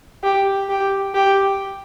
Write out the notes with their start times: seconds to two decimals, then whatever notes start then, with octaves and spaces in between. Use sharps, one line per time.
0.24 G4
0.69 G4
1.15 G4